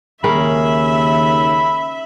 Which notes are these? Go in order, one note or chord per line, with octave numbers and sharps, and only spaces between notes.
D#2 C#3 G#3 C#4 A#4 E5 B5